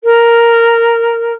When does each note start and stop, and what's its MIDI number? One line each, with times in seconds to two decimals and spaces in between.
0.04 1.32 70